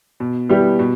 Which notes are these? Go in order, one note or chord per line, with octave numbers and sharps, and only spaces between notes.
B2
G3 B3 E4 G4
B2